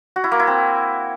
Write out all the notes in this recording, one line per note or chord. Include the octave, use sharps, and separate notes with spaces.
F#4
E4
A#3
E4
C4